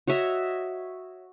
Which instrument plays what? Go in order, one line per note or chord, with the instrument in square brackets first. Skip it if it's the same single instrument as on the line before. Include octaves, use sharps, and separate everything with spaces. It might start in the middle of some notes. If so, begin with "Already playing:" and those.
[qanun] F#4 C#5 D#5 E5